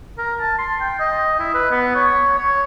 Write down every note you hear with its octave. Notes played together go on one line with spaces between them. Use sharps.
A#4
A5
C6
G5
D#5
E4
B4
B3
C#5
C#5